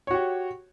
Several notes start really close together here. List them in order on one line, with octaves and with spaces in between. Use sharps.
C#5 F#4 G4